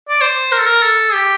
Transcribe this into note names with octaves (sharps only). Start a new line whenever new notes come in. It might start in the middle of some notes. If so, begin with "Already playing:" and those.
D5
C5
A#4
A4
A#4
A4
G4